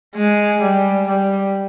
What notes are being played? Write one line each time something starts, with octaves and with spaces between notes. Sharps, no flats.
G#3
G3
G3